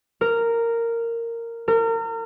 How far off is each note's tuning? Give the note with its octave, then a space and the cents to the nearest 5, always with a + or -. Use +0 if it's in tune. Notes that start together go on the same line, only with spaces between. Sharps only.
A#4 -10
A#4 -35